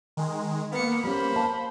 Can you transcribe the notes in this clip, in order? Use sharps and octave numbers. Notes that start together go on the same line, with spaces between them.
D#3 G#3
A#3 B3 C#7
G3 C#4 C5 B5
F5 A5